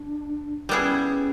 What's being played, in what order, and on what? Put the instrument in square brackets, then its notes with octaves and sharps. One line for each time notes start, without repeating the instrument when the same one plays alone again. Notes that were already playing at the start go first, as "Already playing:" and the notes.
Already playing: [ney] D4
[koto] G3 B3 E4 G#4 [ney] C#4